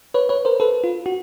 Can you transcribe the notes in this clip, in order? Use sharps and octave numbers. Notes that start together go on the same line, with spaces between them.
B4 C#5
B4 C#5
A#4 C5
A4 B4
F4
F#4